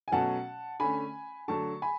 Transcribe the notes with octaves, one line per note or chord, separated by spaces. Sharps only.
G#5
B2 F#3 A3 C#4 F#5 A5
D3 A3 C#4 G#5 B5
D3 F#3 A3 A5 C#6
G#5 B5